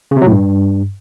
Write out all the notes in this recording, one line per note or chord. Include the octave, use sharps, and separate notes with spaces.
C#3
C3
F#3
A2
G2